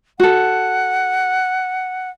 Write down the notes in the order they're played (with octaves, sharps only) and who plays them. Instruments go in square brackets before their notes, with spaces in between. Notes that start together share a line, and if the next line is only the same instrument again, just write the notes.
[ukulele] F#4 A4 [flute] F#5